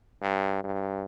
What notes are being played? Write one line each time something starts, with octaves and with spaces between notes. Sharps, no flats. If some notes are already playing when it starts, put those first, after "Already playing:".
G2
G2